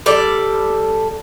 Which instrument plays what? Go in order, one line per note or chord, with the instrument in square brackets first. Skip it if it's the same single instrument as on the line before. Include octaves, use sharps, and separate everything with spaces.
[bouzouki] G3 A4 D5